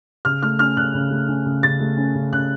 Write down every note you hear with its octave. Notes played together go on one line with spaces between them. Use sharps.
C#3 F6
A3 F6
C#4 F6
C#3 F#6
C#3
A3
C#4
C#3
C#3 A6
A3
C#4
C#3
C#3 F#6